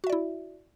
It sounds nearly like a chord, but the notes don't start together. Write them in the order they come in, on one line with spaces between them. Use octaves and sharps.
F#4 E5 D5 E4